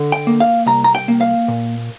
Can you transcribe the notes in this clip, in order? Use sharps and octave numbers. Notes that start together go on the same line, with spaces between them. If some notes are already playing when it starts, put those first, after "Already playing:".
Already playing: D3
G5
A#3
F5
C2 A#5
A#5
G5
A#3
F5
A#2